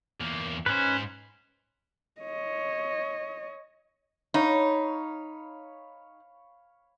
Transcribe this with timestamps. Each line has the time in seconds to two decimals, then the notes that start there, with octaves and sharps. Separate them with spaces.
0.20 E2 A#3
0.66 G#2 C#4 B4 C5
2.21 C#5 D#5
4.34 D#4 C#5 F5 B5